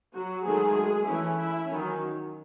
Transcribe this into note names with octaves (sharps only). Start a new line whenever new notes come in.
F#3 F#4
D#3 F#3 G#3 A3 G#4
E3 A3 C#4 E4
E4
D#3 F#3 C#4